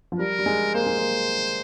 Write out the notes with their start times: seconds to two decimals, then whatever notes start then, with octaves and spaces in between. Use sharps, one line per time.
0.12 F3
0.19 G3 A#4
0.39 G3
0.46 G#3
0.74 A#3 C5
0.87 G#3
0.99 A#3